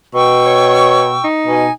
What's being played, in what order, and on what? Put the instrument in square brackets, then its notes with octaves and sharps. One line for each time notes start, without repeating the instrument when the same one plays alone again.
[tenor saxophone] B2 [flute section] G5 C#6 E6
[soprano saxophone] C#5
D#4
[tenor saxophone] B2 [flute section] G#5